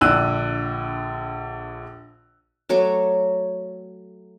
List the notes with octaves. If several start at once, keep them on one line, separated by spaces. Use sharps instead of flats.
A#1 D3 D5 E6 F#6 D#7
F#3 A3 C#5 D6